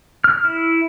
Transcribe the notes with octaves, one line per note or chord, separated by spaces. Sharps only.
F6
E4